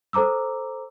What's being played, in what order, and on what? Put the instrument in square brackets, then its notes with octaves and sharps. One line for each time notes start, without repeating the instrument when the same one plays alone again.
[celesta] A4 C5 A#5 D6 E6